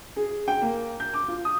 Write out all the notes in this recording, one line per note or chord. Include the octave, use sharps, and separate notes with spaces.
G#4
G5
A#3
G6
D6
F4
D#6